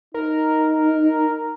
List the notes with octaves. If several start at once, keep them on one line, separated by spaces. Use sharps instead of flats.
D#4 A#4